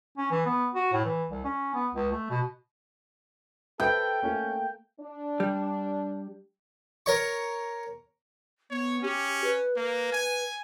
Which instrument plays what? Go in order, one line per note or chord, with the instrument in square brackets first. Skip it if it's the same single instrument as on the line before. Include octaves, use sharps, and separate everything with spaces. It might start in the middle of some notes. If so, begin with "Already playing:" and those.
[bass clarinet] C#4
E3
B3
F#4
A2
E3
C2
C#4
B3
C#2
A3
B2
[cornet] A4 [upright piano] B4 D7 [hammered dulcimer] G5
[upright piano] A3 A#3 [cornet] C#4
[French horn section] D4
[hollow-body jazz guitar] G3
[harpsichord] A#4 C#5 C#6
[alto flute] B3 [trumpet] C#5
[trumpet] C#4 [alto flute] G4
[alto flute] B4
[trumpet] A#3 [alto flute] B4
[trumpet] G#5